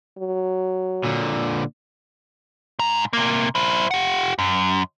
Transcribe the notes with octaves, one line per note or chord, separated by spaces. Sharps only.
F#3
A#2 D3
G#2 A#5
C3 A#3
E4 C5
G4 F#5
F#2